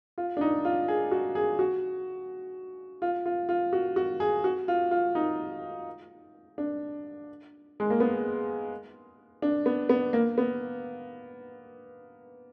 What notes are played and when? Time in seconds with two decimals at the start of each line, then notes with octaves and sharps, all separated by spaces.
0.18 F4
0.37 D4
0.41 D#4
0.65 F4
0.88 G#4
1.11 F#4
1.35 G#4
1.59 F#4
3.02 F4
3.26 F4
3.49 F4
3.73 F#4
3.96 F#4
4.20 G#4
4.44 F#4
4.68 F4
4.91 F4
5.15 D#4
6.58 D4
7.80 G#3
7.90 A#3
8.00 B3
9.42 D4
9.66 B3
9.89 B3
10.13 A#3
10.38 B3